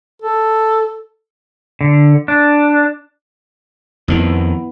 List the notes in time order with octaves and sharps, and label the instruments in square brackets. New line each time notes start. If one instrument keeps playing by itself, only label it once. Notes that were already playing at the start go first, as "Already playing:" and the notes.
[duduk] A4
[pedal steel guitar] D3
D4
[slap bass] F2 D#3 [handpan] B3 E4